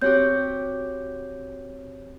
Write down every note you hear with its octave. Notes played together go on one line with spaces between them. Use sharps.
C4 F#4 G4 C#5 G6